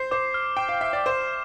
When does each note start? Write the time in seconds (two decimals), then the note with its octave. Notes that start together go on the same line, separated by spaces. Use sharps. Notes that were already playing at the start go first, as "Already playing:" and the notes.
Already playing: C5 C7
0.11 C5 D6
0.34 F6
0.57 G5 D6
0.69 F5
0.81 E5 C7
0.93 D5
1.06 C5 E7